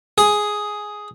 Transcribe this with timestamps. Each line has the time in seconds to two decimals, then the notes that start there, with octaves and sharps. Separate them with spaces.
0.18 G#4